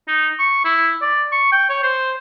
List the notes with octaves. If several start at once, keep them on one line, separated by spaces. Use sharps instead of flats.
D#4
C#6
E4
D5
C#6
G5
C#5
C5